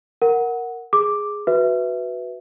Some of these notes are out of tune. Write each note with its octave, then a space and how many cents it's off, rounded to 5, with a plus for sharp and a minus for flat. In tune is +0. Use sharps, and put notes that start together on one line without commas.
A#4 +0 F#5 +0
G#4 +0 D6 +0
F#4 +0 B4 +0 E5 +0